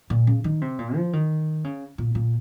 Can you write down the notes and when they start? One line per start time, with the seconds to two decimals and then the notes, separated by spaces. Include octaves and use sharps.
0.10 A#2
0.27 C#3
0.44 D#3
0.61 C3
0.79 A#2
0.96 F3
1.13 D#3
1.64 C#3
1.98 A#2
2.15 A#2